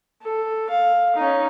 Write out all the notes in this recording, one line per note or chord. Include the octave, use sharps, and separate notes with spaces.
A4
F5
C#4 D#4